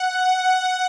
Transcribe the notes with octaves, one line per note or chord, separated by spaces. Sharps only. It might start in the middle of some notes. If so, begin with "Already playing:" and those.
Already playing: F#5
F#5